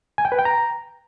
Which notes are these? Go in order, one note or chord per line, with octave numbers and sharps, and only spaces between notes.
G#5
G5
B4
G5
A#5